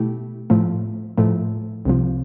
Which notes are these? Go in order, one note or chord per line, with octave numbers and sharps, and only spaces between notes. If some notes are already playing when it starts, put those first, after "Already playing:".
Already playing: B2 A3 E4 G4
A2 F3 A3
A2 F3 A3
C2 C3 F3